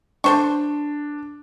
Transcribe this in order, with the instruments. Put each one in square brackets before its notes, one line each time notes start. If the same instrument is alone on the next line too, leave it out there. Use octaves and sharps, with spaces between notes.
[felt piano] D4 [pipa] A4 C5 C#6